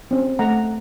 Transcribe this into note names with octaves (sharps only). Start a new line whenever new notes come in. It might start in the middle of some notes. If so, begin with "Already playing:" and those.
C4 C#4
A3 F#5 A#5